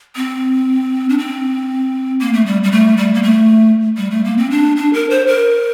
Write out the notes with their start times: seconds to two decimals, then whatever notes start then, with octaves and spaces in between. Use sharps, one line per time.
0.16 C4
1.09 D4
1.18 C4
2.21 A#3
2.33 A3
2.46 G3
2.64 G3
2.72 A3
2.97 G3
3.14 A#3
3.23 A3
3.98 G3
4.11 A3
4.24 A#3
4.37 C4
4.51 D4
4.77 D4
4.94 A#4
5.10 C5
5.27 A#4